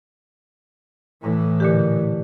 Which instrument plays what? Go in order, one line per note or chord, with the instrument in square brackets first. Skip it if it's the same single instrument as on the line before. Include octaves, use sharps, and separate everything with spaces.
[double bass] A2 E3
[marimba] A#2 D3 G4